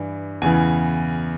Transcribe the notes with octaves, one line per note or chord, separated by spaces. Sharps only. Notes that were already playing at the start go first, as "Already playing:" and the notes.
Already playing: G2 E3
E2 C#3 E3 G#5